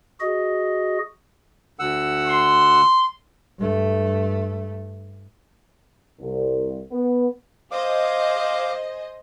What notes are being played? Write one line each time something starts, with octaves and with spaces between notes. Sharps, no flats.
F#4 G#4 D#5
D2 F#5 E6
C6
G2 A3
C2
B3
G#4 C5 D#5 F5 D6